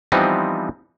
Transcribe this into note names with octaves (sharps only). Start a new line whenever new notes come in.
E3 F3 G3 B3 C4 D#4